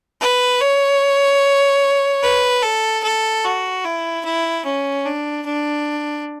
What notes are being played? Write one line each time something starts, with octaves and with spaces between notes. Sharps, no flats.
B4
C#5
B4
A4
A4
F#4
E4
E4
C#4
D4
D4